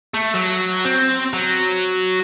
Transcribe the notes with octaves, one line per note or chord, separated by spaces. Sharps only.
A3
F#3
C4
F#3